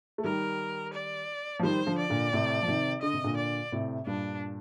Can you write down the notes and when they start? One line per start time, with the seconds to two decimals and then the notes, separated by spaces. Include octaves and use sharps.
0.18 A3
0.24 D#3 G3 A#4
0.93 D5
1.59 F3
1.63 D#3 G3 C5
1.86 D3 F3
1.98 D5
2.10 A#2 D3
2.33 A2 C3
2.62 F3
2.67 C3 D#3
3.02 D3 D#5
3.13 C3
3.24 A#2 D3
3.37 D5
3.72 A2 C3
4.06 G2 A#2 D4